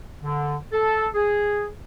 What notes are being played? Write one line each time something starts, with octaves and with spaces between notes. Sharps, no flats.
D3
A4
G#4